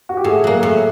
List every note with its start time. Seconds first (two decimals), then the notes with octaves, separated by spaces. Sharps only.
0.09 F#4
0.17 G4
0.24 A2 G#4
0.44 F#3 A#3
0.63 A2